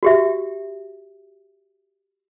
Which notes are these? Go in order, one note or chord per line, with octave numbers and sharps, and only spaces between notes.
F#4 G4 E5